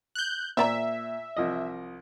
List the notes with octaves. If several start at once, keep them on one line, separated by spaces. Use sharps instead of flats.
F#6 G6
A#2 C5 D5 E5 A#5
C2 F3 D#5